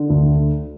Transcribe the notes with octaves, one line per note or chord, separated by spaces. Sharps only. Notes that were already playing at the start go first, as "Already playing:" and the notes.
Already playing: D3
D2